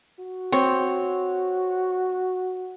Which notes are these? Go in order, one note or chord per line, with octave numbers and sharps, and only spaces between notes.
F#4
C4 C#5